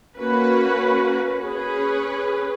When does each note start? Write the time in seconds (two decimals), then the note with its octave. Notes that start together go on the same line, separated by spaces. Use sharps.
0.17 A#3 C#4 F#4 B4
1.41 C#4 G#4 B4